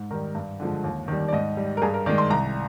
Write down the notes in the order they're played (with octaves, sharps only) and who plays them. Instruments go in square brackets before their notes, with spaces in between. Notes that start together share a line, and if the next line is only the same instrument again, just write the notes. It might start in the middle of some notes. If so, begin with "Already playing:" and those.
Already playing: [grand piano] G#2
D#3 G3 A#4
G2
D3 F3 G#3
D#2
D#3 G3
D5
G#2 D#5
G3
A#4
G2 G#4
A#4
D#3 D5
G#3
C6
C2 A#5